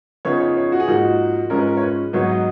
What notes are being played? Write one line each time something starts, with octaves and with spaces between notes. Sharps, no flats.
C#3 F3 B3 D#4 C#5
C#5
C#5
F#4
G#4
G#2 F3 A#3 D#4 F#4
G#2 F3 G#3 C#4 A#4
B4
A#4
C#5
B4
G#2 F#3 B3 D#4 C#5
D#5